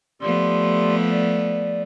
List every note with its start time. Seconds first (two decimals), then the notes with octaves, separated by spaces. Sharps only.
0.21 F3 A3 B3 G4 D5 C6
1.10 D5